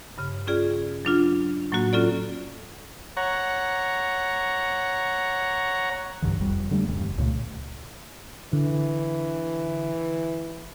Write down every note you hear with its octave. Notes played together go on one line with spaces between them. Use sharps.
G2 C#3
C#4 F4 G#4 D5
F#3 D4 F4
A2 F#3 A#3 F#4
C#4 F4 A4 D5
C#5 F#5 A#5
B1 G2 D3 E3
F1 F2 G3
D3 G3 A3
D#1 E2 G2 C#3
C#2 A#2 C#3 A3
D3 E3